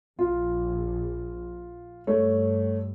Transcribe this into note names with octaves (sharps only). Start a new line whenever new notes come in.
A#1 F4
G2 A3 C#5